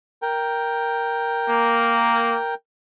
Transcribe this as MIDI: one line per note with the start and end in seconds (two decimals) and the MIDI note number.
0.22 2.54 70
0.22 2.54 79
1.50 2.35 58